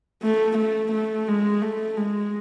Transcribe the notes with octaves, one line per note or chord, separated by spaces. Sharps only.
A3
A3
A3
G#3
A3
G#3